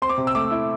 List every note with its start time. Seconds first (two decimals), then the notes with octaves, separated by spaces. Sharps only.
0.02 C4 C6
0.09 D6
0.18 C3
0.27 E6
0.35 A3 D6
0.51 E4